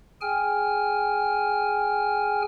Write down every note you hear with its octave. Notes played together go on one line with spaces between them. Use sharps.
G#4 G5 G#5 F6